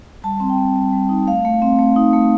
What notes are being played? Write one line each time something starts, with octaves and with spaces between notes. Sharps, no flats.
G3 A5
C4
G5
C4
G3
G3
D#4
A3 F5
A3
C4
A3
D#4
A3